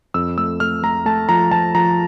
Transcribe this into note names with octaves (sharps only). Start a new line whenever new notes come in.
F2 E6
A3 E6
A3 F6
A3 A#5
A3 A5
F3 A#5
F3 A5
F3 A#5